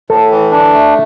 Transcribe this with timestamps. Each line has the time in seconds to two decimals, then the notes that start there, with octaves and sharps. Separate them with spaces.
0.10 A2 A4
0.31 E3
0.52 D4
0.74 A3